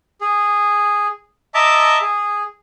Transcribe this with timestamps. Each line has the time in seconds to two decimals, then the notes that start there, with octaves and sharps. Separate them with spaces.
0.21 G#4
1.54 D#5 E5 A5 A#5 D6
2.01 G#4